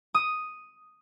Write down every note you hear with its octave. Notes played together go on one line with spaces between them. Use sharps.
D#6